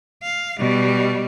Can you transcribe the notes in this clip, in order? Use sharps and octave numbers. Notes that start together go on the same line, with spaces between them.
F5
B2 G3